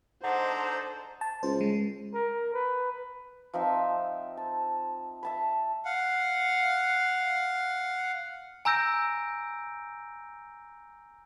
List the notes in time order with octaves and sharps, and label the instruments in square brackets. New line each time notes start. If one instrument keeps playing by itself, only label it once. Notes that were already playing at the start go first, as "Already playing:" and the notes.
[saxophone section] G#2 D4 D#4 [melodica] A4 A#5 [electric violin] C5 [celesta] F#5
[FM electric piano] A5
[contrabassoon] C#2 [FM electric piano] C5
[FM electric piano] G#3
[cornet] A#4
B4
[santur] F3 C4 D#4 E5
A5
E5 A5 B5
[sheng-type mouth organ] F5 F#5
[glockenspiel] G#5 A#5 E6 G6 A#6 D7